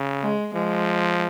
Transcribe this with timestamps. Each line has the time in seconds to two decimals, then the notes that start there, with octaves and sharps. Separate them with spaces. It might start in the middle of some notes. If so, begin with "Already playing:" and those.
Already playing: C#3
0.22 G#3
0.54 F3 G#3